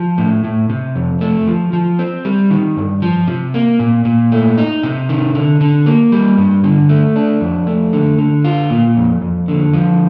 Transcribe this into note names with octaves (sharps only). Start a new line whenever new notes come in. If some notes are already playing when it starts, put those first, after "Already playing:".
Already playing: F3
A2
A2
C3
F2
A3
F3
F3
C4
G3
D#3
G2
F3
C3
A#3
A#2
A#2
A3
D#4
C3
D#3
D3
D3
A#3
G3
G2
D3
A3
D4
F2
A3
D3
D3
F4
A#2
F2
F2
D3
F3